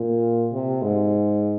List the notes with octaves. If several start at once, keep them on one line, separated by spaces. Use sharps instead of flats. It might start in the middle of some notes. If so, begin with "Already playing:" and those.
Already playing: A#2
C3
G#2